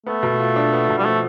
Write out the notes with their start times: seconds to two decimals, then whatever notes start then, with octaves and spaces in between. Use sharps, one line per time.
0.06 A3 B3
0.23 B2
0.39 F4
0.56 D4
0.73 B3
0.89 B2
0.98 G3
1.05 F3 A3